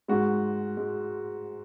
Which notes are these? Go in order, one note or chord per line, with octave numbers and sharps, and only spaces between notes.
G#2 G#3 F#4
G#3